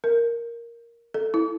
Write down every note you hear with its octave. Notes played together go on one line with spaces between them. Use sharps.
A#4
A4
E4